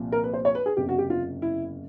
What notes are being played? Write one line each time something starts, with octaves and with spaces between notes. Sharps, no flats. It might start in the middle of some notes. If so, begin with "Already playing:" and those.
Already playing: C2 A#2 F3
A#4
B4
C5
C#5
B4
G#4
F#1 E2 C3 G4
F#4
G4
F4
E4